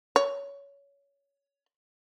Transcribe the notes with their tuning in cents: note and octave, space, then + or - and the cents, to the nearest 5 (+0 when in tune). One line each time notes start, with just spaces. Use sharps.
C#5 +20